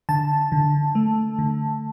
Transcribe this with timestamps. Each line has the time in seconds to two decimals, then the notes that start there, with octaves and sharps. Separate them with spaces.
0.09 D3 A5
0.52 D3
0.95 A3
1.39 D3